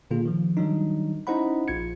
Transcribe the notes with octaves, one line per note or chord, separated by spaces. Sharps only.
A#2 D3 A#3 F4 G#4
D#3 F3
D#3 F#3 G3 D4 D#4
C#4 D#4 E4 C5 F#5 B5
A#1 F4 G#6 C#7